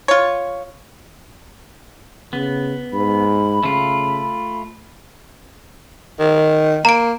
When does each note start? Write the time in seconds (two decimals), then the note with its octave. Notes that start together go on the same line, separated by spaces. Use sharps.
0.08 F4 C#5
2.33 C#3 B3
2.93 G#2 B5
3.63 C#3 A3 F4
6.19 D#3
6.85 A#3 A#5 D7